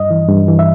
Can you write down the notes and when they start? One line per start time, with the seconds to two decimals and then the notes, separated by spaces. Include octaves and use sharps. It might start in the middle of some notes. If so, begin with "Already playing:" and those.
Already playing: G2 D#5
0.10 E3
0.29 G2
0.48 E3
0.59 E5